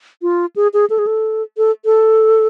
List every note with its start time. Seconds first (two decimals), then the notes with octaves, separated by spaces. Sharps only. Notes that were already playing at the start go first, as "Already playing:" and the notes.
0.22 F4
0.56 G#4
0.74 G#4
0.90 A4
0.99 G#4
1.07 A4
1.57 A4
1.85 A4